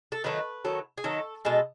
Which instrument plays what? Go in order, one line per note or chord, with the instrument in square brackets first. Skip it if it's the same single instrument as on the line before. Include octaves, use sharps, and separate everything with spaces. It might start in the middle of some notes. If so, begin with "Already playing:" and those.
[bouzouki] A4
D#3 F#3 A3 B4
D#3 F#3 A3
G#4
D#3 F#3 A3 A4
B2 G#3 A4